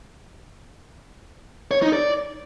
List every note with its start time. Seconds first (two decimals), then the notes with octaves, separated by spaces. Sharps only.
1.71 C#5
1.82 D#4
1.93 D5